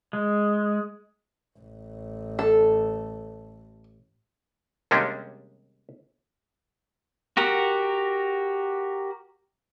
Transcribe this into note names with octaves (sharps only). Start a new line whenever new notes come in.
G#3
A1
A4
D#2 C3 G3 G#3 C#4 D4
F#4 G4 A#4 F#5